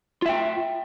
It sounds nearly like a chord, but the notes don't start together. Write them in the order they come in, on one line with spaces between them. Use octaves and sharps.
F4 E5 G5